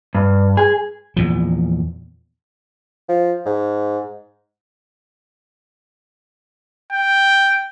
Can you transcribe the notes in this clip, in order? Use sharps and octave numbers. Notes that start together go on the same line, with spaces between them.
G2
G#4
E2 A#2 F3
F3
G#2
G5